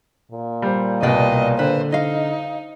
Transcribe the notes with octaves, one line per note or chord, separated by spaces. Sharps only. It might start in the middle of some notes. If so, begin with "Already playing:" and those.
A#2
G3 C5
C2 B2 B4 D5 D#5 G5
D3 B4 C5
D#4 D#5 F5